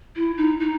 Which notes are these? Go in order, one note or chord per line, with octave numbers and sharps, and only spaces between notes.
E4
D#4
D#4